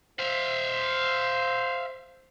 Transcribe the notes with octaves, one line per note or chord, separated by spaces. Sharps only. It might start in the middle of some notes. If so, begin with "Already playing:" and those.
C5 E5 F5